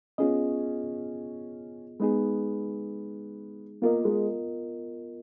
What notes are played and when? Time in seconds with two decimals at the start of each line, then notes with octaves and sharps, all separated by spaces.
0.18 B3 C#4 F4 G#4 D#5
2.00 G#3 B3 D#4 G#4
3.82 A#3 B3 F4 A#4 D#5
4.05 G#3